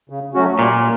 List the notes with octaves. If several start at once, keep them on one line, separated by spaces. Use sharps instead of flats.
C#3
F#3 A3 C#4 F#4
A#2 G3